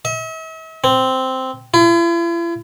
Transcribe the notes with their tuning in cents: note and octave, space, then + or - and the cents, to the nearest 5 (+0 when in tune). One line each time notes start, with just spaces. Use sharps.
E5 -45
C4 -5
E4 +45